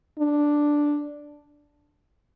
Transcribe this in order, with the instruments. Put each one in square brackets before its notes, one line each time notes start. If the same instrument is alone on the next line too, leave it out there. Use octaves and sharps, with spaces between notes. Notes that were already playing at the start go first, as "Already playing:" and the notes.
[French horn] D4